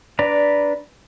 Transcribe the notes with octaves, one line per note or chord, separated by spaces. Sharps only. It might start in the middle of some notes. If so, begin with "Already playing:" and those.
D4 B4 D5 A#5